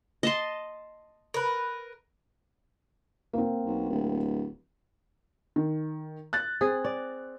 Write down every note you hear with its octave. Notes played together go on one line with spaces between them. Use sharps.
D#5 A5 C6
A#4 B4
A#3 C4
B1
D1
D#3
F#6 A6
C4 G#4
D5